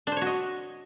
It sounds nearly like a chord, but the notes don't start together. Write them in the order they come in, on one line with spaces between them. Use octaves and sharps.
D4 C5 C#5 F#4 D#5